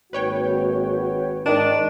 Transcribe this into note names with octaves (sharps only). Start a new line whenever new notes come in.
G#1 A#3 F#4 B4 C#5 G5
G#2 D#3 D4 D#7